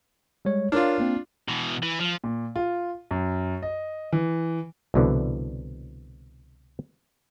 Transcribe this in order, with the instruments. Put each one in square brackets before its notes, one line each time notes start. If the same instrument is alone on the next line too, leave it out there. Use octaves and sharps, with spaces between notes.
[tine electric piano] G3 G#3 C#5
[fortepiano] D4 F4 [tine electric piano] A#4 C#5 F6
[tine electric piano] A#3 C4
[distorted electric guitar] B2 E3
E3
F3
[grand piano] A#2
F4
F#2
D#5
E3
[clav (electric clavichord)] C2 B2 D3 E3